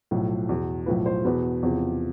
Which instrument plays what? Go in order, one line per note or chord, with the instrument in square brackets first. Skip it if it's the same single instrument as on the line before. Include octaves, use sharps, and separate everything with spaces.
[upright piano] B1 A2 F3
E2 B2
B1 A2 F3 B4
C5
E2 B2 B4
E2 C3 F3